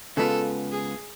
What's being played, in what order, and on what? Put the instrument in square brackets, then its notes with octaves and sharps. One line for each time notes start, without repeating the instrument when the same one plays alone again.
[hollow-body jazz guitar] C#3 G#3 B3 F4 [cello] A4
[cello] G#4